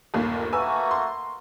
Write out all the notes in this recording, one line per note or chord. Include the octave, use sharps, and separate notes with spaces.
G1 D#2 A#2
A3 A#3 F#4 B4 G#5 E6
C6